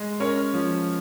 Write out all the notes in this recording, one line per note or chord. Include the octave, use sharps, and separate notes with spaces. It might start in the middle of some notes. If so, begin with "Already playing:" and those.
Already playing: G#3
C#4 A#4 C#5
F3